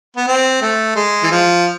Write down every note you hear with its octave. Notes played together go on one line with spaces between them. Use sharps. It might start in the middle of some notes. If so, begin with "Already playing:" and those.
B3
C4
A3
G#3
E3
F3